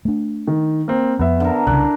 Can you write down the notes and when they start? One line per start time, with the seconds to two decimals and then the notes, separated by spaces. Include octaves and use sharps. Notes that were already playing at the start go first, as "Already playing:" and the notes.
0.05 A3 D4
0.47 D#3
0.88 A#3 C4
1.19 F2 B3 E5
1.40 D3 A#4
1.67 C2 C#3 D4 E4 F#6